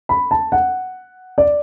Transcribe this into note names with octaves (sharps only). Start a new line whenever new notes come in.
B5
A5
F#5
D5